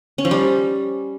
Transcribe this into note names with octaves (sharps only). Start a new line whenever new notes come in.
C#4
F3
G3